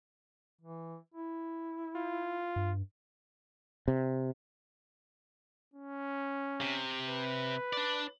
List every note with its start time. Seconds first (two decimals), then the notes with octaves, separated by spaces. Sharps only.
0.61 E3
1.14 E4
1.96 F4
2.56 G2
3.88 C3
5.74 C#4
6.61 C3
7.06 B4
7.73 D4 D5